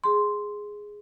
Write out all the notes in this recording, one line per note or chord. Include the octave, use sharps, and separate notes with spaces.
G#4 C6